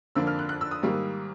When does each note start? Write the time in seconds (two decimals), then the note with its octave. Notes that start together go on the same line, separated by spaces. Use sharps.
0.15 F2 D3 F3 A#3 D4 E6
0.27 F6
0.39 F#6
0.49 F#6
0.61 E6
0.71 D#6
0.83 G#2 D#3 G3 A#3